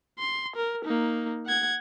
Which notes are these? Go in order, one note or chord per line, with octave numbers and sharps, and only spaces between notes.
C6
A#4
A#3 D#4
F#5 G#6